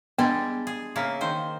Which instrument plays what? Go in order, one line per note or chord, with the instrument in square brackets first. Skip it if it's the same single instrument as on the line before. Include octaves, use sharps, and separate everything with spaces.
[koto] G3 G#3 D4 [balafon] B3
[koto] G#4
C#3 A#3 E4
D#3 C5